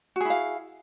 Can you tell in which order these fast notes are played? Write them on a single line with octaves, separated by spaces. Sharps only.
F#4 G#4 E4 F5